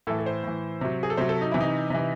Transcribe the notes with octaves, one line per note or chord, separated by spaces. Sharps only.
A2 E3 A4
A4
C5
A2 E3
C3 F#3
G#4
A4
C3 F#3 C5
A4
D#4
C3 E3 E4
D#4
C3 E3